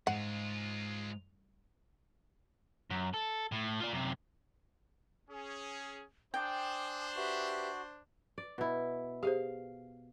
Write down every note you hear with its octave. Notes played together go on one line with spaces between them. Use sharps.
G#2 G#3 F4 F#5
F#2
A4
A2
F4 D5
F#2 C3
C#4 G#4
D4 C5 G5 G#5 D6 D#6
F#4 G4 B4 E5
D5
B2 E4
G4 G#4 C5 F5